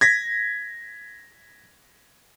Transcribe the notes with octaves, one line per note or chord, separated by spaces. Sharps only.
G#6 A#6 B6